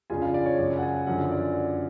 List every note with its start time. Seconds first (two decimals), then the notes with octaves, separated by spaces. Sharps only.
0.10 F2 C#3 G#3 D4 F4 G#5
0.22 F5
0.34 D5
0.46 C#5
0.58 F#2 C#3 G#3 D5
0.70 G#5
0.78 F#5
0.83 G#5
0.95 F#5
1.07 F#2 D3 F3 G#3 F#5
1.32 D5